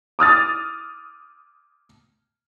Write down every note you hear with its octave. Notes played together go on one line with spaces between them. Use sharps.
D6 D#6 F6 A6